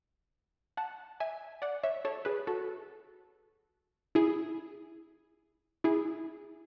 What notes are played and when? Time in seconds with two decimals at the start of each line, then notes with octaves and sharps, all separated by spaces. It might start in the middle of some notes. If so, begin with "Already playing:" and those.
0.77 F#5 A5
1.20 E5 G#5
1.62 D5 F#5
1.83 C#5 E5
2.05 A4 C#5
2.25 G#4 B4
2.47 F#4 A4
4.15 E4 G#4
5.84 E4 G#4